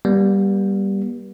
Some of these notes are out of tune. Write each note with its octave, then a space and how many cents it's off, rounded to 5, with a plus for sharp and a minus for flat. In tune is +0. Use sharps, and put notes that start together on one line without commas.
G3 +0 B3 -45